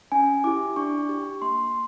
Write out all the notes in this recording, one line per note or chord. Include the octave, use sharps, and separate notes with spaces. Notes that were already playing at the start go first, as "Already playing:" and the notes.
C#4 G#5
E4 G4 D6
D4 C#6
G4
A#3 C6